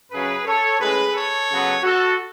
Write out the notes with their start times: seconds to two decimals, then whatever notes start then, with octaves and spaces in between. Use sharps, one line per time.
0.11 F#2 C#3 F#3 C#4 G#4 B4
0.45 A4 C#5
0.79 A2 G#3 C#4 G#4 B4
1.14 A4 C#5
1.48 C#3 F#3 B3
1.83 F#4 A4